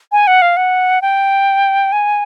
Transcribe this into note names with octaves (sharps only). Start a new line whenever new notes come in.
G#5
F#5
F5
F#5
G5
G#5